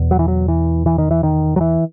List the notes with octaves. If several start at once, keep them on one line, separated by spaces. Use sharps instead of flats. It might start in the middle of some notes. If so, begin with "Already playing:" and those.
Already playing: E2 B2
F#3
E3
F#3
E3
E3
D#3
E3
D#3
F#3
E3